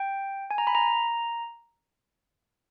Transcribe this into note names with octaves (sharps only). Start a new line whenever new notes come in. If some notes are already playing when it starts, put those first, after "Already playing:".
Already playing: G5
G#5
A#5
B5
A#5